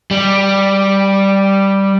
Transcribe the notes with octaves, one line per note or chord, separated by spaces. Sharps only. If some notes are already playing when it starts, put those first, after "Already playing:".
G3